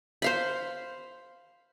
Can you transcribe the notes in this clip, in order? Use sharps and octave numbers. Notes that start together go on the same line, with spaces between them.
C5 F5 B5